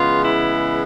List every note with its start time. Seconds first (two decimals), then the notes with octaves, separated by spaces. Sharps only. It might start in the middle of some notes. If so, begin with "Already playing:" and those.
Already playing: C#3 E3 G#3 B3 F4
0.24 E4